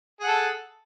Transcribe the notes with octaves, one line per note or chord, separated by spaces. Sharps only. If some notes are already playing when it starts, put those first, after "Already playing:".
G#4 A4 F#5